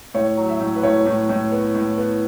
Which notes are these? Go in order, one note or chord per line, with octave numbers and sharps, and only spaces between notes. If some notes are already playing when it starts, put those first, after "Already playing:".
A2 C#5
F#3
E5
A2
B4
A2 C#5
A2
A2
B3
A2
B3